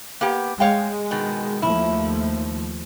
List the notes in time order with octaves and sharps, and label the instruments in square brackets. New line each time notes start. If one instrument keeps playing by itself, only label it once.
[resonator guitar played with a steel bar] A#3 B3 G4
[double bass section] G#3 [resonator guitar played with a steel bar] C#5 F5 G5
[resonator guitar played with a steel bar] B2 D#3
[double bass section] D#2 F3 A3 [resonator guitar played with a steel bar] E4